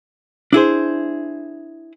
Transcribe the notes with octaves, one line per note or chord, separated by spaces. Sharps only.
D4 E4 G#4 C5